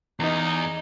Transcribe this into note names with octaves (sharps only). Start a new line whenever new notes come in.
E2 D#4 D#5